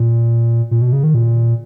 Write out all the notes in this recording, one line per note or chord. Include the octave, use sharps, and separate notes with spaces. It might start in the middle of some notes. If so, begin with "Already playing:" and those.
Already playing: A#2
A#2
B2
C#3
D#3
A#2